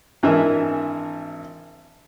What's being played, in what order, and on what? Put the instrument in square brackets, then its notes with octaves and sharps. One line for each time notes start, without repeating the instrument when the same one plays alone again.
[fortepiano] G#1 E3 D4 A#4 E5 G#5